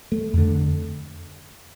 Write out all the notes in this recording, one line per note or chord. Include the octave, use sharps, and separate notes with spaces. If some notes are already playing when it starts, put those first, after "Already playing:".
A3
F2 D3